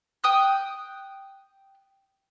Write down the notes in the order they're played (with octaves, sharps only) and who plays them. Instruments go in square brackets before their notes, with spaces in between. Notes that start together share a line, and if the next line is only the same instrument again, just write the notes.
[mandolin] G5 D#6 F#6